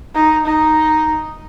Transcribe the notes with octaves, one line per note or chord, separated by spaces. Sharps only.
D#4
D#4